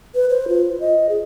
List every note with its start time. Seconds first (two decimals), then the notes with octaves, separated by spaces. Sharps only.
0.15 B4
0.30 C5
0.48 F4
0.80 D#5
1.09 G#4